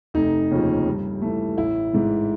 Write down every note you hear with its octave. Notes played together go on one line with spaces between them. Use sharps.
F1 D#4
D#2 C#3 F3
G2
E3 A3
A1 E4
G#2 E3